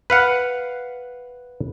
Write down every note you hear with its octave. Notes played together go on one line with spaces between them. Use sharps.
B4 F5 F#5